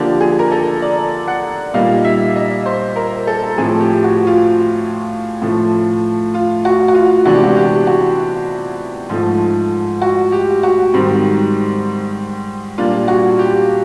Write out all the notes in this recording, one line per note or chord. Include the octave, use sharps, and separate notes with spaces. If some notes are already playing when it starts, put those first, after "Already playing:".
Already playing: D3 F3 A#3 D4 G4
G#4
A#4
A4
D5
F#5
A#2 G3 A#3 D#4 F5
E5
D#5
C5
A#4
A4
A2 F3 A3 C4 G#4
G4
F#4
F4
A2 F3 A3
F4
F#4
F#4
F4
C3 E3 G#3 B3 D4 F#4
G4
F#4
G4
F#4
G#2 F3 A3
F#4
G4
F#4
G#2 D#3 G3 C4
A#2 G3 A#3 D4 F4
F#4
G4